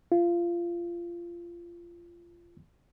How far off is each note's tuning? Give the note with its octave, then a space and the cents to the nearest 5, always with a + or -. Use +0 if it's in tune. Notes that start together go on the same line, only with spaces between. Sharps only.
F4 -20